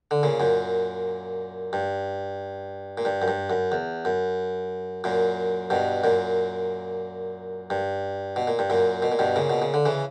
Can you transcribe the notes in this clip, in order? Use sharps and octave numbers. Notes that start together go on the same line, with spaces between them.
D3
A#2 C#3
F#2 A#2
G2
A#2
G2
F#2
G2
F#2
E2
F#2
F#2 A#2
G2 B2
F#2 A#2
G2
B2
A#2
G2
F#2 A#2
B2
A#2
G2 B2
A#2 C#3
B2
C#3
D3
C#3 E3